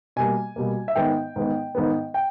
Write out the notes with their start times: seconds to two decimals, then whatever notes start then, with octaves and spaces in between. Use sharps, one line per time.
0.16 B2 G3 A#3 G#5
0.56 B2 G3 A#3
0.88 E5
0.95 G#2 D#3 G#3 B3 G5
1.36 G#2 D#3 G#3 B3
1.75 G#2 D#3 G#3 B3
2.14 G5